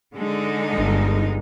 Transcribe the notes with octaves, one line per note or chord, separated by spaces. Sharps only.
D3 G#3 D#4
G1